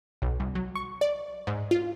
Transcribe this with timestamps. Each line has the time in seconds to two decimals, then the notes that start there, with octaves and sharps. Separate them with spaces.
0.22 B1
0.40 C2
0.55 F#3
0.75 C#6
1.01 D5
1.47 G#2
1.71 F4